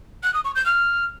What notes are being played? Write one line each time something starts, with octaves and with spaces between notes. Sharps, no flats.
F#6
D#6
C#6
G6
F6